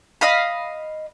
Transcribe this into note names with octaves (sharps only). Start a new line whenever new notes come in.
D#5 F5 B5